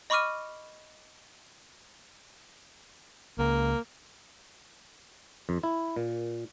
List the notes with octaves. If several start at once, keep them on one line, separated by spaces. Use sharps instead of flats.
D#5 B5 C#6 D6 F6 D#7
C#2 A#3
F2
E4
A#2